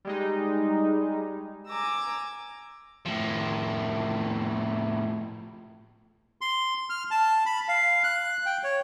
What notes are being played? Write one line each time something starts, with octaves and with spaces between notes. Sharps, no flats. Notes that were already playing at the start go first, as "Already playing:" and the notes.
G3 G#3 D#4
G#5 A#5 D6 E6
A2 F3
C6
F6
A5
B5
F5
F#6
G5
C#5